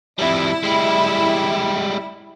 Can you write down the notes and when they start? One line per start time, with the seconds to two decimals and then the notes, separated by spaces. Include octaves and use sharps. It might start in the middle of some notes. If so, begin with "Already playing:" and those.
0.19 F2 G3 E4
0.63 G3 G#3